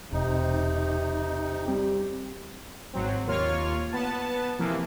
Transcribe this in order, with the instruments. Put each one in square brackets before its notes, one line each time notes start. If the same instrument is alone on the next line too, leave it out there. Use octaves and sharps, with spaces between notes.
[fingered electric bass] E1 [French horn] C3 [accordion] D#4
[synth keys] G3 C4 G4
[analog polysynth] G#1 F#3 C4
D#2 A#3 F4 C#5 F6
B3 A5
C3 E3 F3 A#3 E4